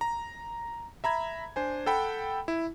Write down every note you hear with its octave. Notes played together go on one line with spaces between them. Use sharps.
A#5
E5 A#5 B5 G#6
D4 C5 G#5
A4 F#5 G5 B5
E4